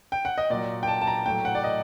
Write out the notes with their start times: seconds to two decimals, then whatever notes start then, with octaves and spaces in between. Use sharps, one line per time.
0.12 G5
0.25 F#5
0.38 D#5
0.50 A#2 F#3 D5
0.83 G5
0.88 A5
1.02 A5
1.07 A#5
1.26 A2 F#3 G5
1.45 F#5
1.55 D5
1.64 D#5